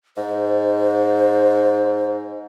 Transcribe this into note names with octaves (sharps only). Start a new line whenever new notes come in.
G#2 C5